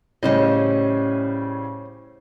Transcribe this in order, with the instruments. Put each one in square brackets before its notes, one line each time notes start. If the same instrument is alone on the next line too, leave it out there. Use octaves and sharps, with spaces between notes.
[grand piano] A2 C#3 G3 [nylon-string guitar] C#4 C5 D#5